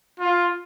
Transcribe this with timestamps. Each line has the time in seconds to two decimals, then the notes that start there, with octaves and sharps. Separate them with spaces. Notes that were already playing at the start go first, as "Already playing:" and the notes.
0.20 F4